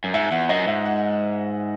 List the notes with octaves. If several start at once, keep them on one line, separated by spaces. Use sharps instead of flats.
F#2
G#2 E5
E2 F#5
F#2 D#5
G#2 E5
F#5